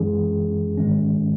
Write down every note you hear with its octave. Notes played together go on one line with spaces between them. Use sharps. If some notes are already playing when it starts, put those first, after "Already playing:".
Already playing: F#2 E3 G#3 C#4 G#4
G#2 D#3 G#3 C#4